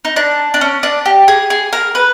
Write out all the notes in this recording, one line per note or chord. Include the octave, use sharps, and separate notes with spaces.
D#4
D4
D4
C#4
D4
G4
G#4
G#4
A#4
B4